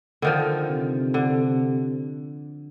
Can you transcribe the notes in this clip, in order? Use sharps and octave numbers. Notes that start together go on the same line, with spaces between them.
D3 D#3 F3
C3
D3